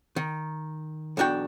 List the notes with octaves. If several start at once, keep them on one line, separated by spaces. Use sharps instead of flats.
D#3
B1 E2 D4 F#4 G5